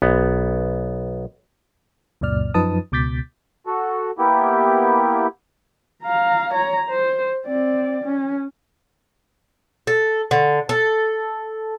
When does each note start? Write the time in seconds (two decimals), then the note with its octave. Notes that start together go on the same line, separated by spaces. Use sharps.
0.02 B1 B3
2.21 C#2 F#2 A#2 D5 F6
2.54 F#2 F3 D#4 B4 A5 D#6
2.92 C#2 B2 D6 G6 A6 B6
3.67 F#4 A4
4.18 A#3 B3 E4 G4
6.03 F5 A#5
6.54 C#5 A#5
6.90 C5
7.45 C4 D5
8.04 C#4
9.87 A4
10.31 D3
10.69 A4